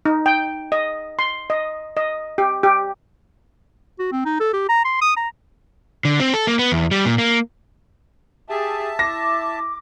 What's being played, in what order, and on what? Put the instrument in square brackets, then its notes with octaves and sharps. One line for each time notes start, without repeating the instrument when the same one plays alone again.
[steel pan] D#4
G5
D#5
C6
D#5
D#5
G4
G4
[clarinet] F#4
C4
D#4
A4
G4
A#5
C6
D#6
A#5
[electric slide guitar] D3
C4
A4
A#3
B3
E2
G3
A#2
A#3
[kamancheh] G4 G#4 [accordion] E5 A5
[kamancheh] E4 [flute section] D6 [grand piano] A#6